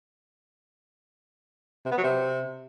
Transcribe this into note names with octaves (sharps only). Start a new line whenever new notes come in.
C3
B3
F#3
C3